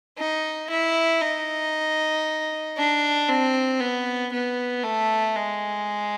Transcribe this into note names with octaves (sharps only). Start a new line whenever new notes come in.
D#4
E4
D#4
D4
C4
B3
B3
A3
G#3